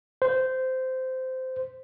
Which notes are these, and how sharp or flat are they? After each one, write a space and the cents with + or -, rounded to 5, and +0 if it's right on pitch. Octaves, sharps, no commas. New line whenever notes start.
C5 -15